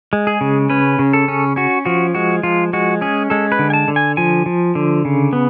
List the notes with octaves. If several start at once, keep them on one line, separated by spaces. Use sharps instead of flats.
G#3
G#4
C#3
C#4 B4
C#3
A4
C#4
C#4 F#4
F3 F#4
G#3 F#4
F3 F4
G#3 F#4
C#4 G#4
G#3 A4
B4
D3
G#5
A5
D3
G#5
F3 G#5
F3
D3
C#3
B3